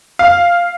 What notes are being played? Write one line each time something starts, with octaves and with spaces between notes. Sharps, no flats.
F5